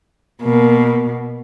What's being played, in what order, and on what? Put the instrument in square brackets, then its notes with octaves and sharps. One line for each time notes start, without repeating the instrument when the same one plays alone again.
[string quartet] B2 [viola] A#3